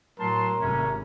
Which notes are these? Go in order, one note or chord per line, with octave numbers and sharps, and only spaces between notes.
A2 F#3 A#4 A5 C6
G#1 C3 A3 C#4